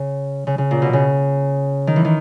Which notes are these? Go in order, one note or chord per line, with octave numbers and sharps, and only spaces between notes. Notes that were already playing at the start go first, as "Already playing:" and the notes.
Already playing: C#3
C#3
C#3
A#2
B2
C#3
D#3
E3
D#3